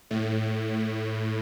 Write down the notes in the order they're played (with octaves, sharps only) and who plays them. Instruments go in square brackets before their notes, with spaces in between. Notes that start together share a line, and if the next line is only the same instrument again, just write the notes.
[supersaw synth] A2